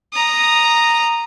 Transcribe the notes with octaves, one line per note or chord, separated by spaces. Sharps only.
A#5 D#6